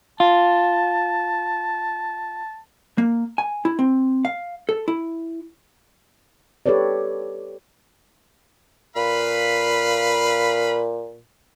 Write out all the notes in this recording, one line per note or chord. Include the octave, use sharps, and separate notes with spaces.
F4 A5
A#3
G#5
E4
C4
F5
A4
E4
G4 A4 B4 C#5 D5
A#2 B4 F5 B5